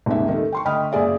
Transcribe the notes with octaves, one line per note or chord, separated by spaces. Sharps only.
D#1 D#2 G#2 C3 E5
D#3 A3
G5 C6 C#6
D2 D#5 G5 B5 D#6 F6
F#2 A#2 C#3 G#4 D5 E5